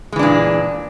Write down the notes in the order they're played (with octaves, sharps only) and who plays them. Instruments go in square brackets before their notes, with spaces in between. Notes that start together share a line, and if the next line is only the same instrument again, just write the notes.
[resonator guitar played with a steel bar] G#3
E3
D4
A#2